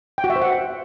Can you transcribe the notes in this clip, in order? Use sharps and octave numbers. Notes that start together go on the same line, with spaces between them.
G5
F#4
E5
C5
F#5